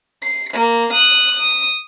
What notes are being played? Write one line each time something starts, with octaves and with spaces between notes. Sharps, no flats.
C7
A#3
D#6 F#6
D#6